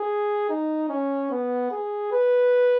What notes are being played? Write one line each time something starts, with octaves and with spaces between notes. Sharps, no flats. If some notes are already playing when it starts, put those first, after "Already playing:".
Already playing: G#4
D#4
C#4
B3
G#4
B4